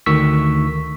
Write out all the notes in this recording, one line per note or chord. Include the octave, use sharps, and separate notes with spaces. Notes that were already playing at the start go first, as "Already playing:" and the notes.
D2 D#3 C#6 E6 B6